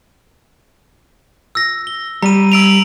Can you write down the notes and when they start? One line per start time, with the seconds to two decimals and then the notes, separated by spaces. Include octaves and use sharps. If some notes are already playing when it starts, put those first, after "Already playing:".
1.55 E6 A#6
1.87 G7
2.22 G3 A#5 D#7
2.52 E6 D7 F7